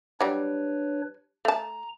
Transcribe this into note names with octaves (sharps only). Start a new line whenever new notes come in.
F#3 G3 D4 B4 C#5
A3 A5 A#5